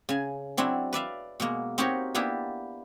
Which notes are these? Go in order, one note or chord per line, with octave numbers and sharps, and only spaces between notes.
C#3 G#5
F#3 C4 D4 E4
B4 D5 E5 F5
B2 G#3 A#3
C4 D#4 F#4 G4 A#4 C#5
A#3 B3 D4 E4 G4